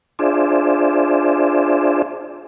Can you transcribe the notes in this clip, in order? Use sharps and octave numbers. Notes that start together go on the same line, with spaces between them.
D4 F4 G#4 C5 D5 E5